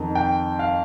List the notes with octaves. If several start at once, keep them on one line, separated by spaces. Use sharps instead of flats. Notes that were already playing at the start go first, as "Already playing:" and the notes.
Already playing: F2 D#3
G5
F5